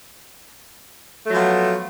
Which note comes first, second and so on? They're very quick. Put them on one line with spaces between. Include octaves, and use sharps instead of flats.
A3 F#3 F3 B3